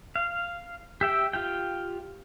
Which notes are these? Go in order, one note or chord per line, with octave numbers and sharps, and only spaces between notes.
F5
G4 E5 G5
F4 G4 G5